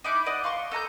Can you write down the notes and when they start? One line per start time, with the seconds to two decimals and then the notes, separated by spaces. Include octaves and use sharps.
0.04 D#4 E4 D6 F#6
0.26 D5 D#5 F#5
0.44 F5 C6 C#6
0.71 A4 D#5 A#5 G6